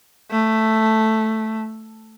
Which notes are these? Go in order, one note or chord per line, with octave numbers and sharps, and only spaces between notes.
A3